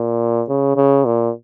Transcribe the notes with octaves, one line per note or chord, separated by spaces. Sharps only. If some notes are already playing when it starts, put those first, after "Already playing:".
Already playing: A#2
C#3
C#3
A#2